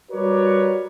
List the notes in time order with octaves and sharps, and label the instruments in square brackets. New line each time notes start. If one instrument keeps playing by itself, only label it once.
[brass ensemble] G3 F#4 A#4 B4 C#5 D5